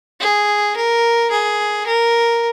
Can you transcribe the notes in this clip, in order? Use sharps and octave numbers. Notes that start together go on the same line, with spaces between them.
G#4
A#4
G#4
A#4